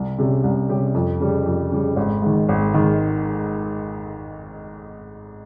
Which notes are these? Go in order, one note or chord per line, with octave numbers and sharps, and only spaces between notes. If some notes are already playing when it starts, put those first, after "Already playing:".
Already playing: C2
C3 G3 C#4 G4
C2
C3 G3 C#4 G4
F2
C#3 G3
F2
C#3 G3
G#1
G#2 D#3
G#1
G#2 D#3